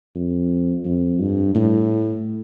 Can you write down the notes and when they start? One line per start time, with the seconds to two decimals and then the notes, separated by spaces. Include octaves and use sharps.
0.15 F2
0.85 F2
1.19 G2
1.55 A2